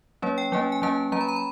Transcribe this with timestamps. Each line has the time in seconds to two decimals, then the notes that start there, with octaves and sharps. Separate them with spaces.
0.22 F#3 A#3 C#4 C#5
0.38 G5
0.52 F#3 A#3 C#4 G#5
0.72 G#5
0.82 F#3 A#3 C#4 A5
1.12 F#3 A#3 C#4 A#5
1.21 B5
1.28 A#5
1.36 B5